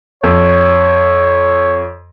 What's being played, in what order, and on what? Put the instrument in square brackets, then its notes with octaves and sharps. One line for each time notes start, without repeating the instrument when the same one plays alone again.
[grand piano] F2 [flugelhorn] C#5